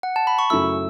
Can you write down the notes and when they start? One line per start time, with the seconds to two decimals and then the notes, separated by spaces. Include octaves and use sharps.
0.03 F#5
0.16 A5
0.27 B5
0.39 C#6
0.50 F#2 C#3 A3 E4 E6